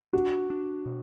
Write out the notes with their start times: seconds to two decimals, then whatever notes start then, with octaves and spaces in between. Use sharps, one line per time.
0.13 D4 F#4
0.50 D4
0.86 B2